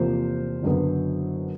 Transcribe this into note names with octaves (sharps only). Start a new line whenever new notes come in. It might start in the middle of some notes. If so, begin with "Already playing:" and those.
Already playing: E2 C3 F3 A#3 C5
F#1 F#2 D3 F#3 B3